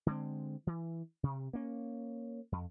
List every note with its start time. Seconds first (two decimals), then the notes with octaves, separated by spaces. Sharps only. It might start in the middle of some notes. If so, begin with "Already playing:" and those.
0.06 D3 G#3 C4
0.67 E3
1.23 C3
1.53 A#3 C#4
2.52 F2